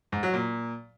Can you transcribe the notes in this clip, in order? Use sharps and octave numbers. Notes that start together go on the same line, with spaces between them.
G#2
F#3
A#2